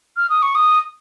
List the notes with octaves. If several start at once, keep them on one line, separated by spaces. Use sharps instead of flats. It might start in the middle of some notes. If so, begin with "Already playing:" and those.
F6
D#6
C#6
D#6